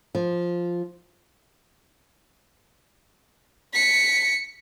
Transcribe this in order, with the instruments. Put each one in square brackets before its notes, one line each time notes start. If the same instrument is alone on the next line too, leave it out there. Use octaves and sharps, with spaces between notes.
[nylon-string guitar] F3
[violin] B6 C#7